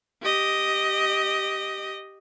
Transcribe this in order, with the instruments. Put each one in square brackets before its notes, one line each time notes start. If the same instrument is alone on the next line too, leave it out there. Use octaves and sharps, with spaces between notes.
[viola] G4 D#5